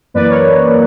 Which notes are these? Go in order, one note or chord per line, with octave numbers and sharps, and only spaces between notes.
F#2 E3 A#3 B4 D5
A#4 C#5